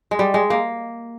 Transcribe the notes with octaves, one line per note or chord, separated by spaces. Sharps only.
G#3
G3
G#3
A#3